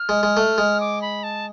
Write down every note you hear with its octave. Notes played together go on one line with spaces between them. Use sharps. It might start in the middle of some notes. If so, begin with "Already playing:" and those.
Already playing: F6
G#3
G#3
A3
G#3
D6
B5
A5